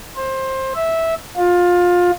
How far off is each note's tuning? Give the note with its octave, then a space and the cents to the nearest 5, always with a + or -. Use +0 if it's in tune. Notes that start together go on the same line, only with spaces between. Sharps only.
C5 +20
E5 -10
F4 +20